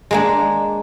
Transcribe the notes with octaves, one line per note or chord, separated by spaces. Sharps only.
G#3 A#3 D4